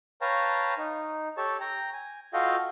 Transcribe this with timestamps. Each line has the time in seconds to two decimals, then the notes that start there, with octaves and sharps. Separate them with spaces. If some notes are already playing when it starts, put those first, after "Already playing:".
0.21 B4 C#5 F5 G5 A5 A#5
0.78 D#4
1.37 G4 A4 C#5 A5
1.61 G5 A#5
1.93 G#5
2.33 F4 F#4 A4 D#5 F5 G5